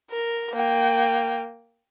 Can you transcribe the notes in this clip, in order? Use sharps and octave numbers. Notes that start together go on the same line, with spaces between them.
A#4
A#3 G5